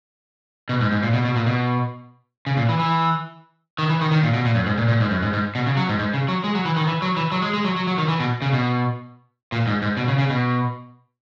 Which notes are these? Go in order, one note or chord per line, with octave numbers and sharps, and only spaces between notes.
B2
G#2
G#2
A#2
B2
B2
A#2
B2
C#3
A#2
E3
E3
D#3
E3
D#3
D#3
A#2
B2
A#2
F#2
G#2
A#2
A#2
G#2
F#2
G#2
G#2
B2
C#3
F#3
G#2
G#2
C#3
F#3
G#3
F#3
E3
D#3
E3
F#3
E3
F#3
G#3
G#3
F#3
F#3
F#3
D#3
E3
B2
C#3
B2
A#2
G#2
G#2
B2
C#3
C#3
B2